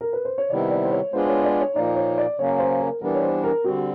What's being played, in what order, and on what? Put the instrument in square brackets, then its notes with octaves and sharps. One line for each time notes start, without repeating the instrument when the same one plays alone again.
[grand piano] A#4
B4
C5
C#5
[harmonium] C3 D#3 G3 B3 E4 [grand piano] D5
[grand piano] D5
C5
C#5
[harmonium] G#3 B3 D4 F4 G#4 [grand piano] C5
[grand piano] C#5
D5
C#5
[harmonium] A#2 F3 A#3 D#4 [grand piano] D5
[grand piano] C#5
D5
[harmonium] C#3 F#3 A#3 C#4 [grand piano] C#5
[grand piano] C5
A#4
[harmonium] E3 G3 B3 D4 [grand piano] A#4
[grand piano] C#5
C5
A#4
[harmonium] D3 G3 C4 [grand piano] F#4